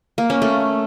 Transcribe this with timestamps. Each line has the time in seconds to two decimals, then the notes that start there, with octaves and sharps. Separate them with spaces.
0.18 A#3
0.30 C#4
0.42 A3